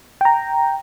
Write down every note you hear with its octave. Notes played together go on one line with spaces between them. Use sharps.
G5 A#5